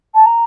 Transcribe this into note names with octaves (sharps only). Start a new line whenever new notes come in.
A5
A#5